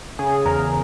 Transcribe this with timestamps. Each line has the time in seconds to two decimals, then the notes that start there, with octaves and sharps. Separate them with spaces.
0.19 C#3 G#4
0.45 E2 A#4